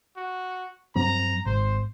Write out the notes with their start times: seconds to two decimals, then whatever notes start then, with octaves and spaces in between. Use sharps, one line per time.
0.16 F#4
0.96 G2 F#3 C4 A#5
1.46 G#1 C5